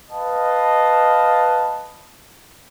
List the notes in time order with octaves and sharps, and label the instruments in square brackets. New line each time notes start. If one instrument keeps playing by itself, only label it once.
[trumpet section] B4 D#5 F5 A5